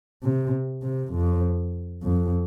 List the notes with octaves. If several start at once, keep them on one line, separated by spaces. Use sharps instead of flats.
C3
C3
F2
F2